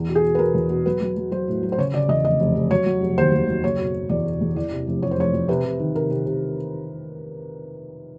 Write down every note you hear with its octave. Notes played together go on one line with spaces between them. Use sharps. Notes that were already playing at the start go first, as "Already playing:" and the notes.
Already playing: E2
B2
G#4
B2
B4
B2 A#4
E2
B2
F#3 B4
F#3
F#3
F#3 C5
A2
F#3
C5
C#3 C#5
C#3 D5
E2 D#5
F1 D#5
F1
F1
F#3 C#5
F#3
F1
D#2 C5
D#2
F#3
F#1 C#5
B2
B2
E2 D5
B2
E2
E3 D5
C3
F1
F2 C#5
C5
F1 C#5
F2
C3 B4
C3
D#3
C3 A#4
C3
C3